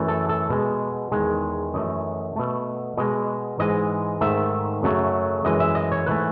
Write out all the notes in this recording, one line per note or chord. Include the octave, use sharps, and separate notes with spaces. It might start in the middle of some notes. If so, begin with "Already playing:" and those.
Already playing: F#2 E3 A3
A4
A4
B2 G#3
E2 D#3 G#3
F#2 E3 A3 D#5
B2 A3
B2 G#3 D#5
G#2 E3 G#3 D#5
G#2 D#3 A3 E5
F#2 C#3 F#3 A3
F#2 E3 G#3 D#5
E5
D#5
C#5
G#2 E3 A3 B4